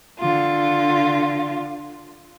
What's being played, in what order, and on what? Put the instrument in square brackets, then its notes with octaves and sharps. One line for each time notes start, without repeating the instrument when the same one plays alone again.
[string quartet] D3 F4